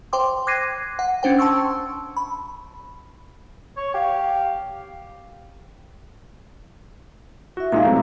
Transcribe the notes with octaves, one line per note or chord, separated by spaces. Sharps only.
C5 G5 C6 D6
D6 F#6 G#6 A#6 C7 D#7
F#5
C#4 D4 C5 G5
A5 C6 C#6 E6
B5
C#5
G4 F5
E4 F#4 E5
A#2 G#3 D#4 F5 A#5
C3 F#3 A3